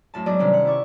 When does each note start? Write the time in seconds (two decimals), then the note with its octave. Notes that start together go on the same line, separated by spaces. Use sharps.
0.14 F#2 A2 A5
0.26 G#2 F#3 B3 D5 D#5
0.39 G2 C3 D#3 G3 C#4
0.53 F#5
0.65 E4 D5 C#6